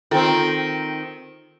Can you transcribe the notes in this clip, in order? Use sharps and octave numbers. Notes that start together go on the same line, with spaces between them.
D#3 C4 F4 A4 G5